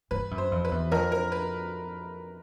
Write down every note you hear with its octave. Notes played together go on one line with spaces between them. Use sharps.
G2 B4
F#2
C5
F2
B4
E2
F2 A#4
A#4
B4